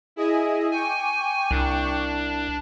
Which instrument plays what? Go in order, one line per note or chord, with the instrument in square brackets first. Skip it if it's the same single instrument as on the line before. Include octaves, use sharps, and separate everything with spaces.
[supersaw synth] E4 G#4 D#5
[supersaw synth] G5 C#6 D6 [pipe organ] G#5
[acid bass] C2 [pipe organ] D4